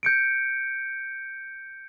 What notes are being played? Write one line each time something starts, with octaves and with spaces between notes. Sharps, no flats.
G6 C#7 D7